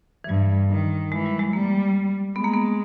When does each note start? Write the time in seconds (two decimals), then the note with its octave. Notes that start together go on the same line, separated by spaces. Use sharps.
0.24 E3
0.29 G2 G3
0.70 D#3
1.12 E3 G#3
1.25 G3
1.39 G#3
1.53 G3 A#3
2.36 G#3 B3
2.44 A#3
2.53 B3